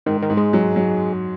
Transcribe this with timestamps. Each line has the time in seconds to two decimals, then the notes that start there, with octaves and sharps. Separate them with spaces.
0.06 G#2 D#3
0.22 D#3
0.30 G#2
0.37 G#3
0.53 F#3
0.76 F#3